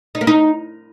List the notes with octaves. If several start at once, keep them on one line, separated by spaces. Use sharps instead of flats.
D#4
A#3
D#4